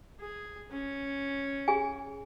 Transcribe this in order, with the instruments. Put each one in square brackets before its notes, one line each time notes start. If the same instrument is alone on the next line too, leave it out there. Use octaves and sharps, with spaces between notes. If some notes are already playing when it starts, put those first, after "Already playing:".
[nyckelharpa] G#4
C#4
[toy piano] G#4 G#5